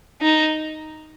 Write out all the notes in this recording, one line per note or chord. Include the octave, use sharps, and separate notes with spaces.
D#4